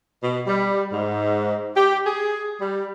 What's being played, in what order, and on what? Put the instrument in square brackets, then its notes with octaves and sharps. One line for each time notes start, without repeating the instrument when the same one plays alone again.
[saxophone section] B2
G3
G#2
G4
G#4
G3